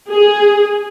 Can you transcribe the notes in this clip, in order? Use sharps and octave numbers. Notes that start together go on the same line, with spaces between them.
G#4